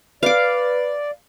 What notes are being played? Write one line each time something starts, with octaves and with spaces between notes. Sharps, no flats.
B4 D5 F5 D6